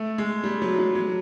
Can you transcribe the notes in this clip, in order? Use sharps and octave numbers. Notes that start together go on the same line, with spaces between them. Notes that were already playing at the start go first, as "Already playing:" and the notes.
Already playing: A3
G#3
G3
F#3
F#3
F#3